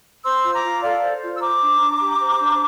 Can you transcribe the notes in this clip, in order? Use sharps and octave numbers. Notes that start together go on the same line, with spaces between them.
C5 C6 E6
F4
A#5 D6
F4
A4 D5 F5
C5
F4
E6
C5 A#5 D6
D4
D4
G4
C5
D4